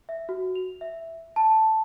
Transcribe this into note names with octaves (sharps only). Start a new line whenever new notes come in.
E5
F#4
F7
E5
A5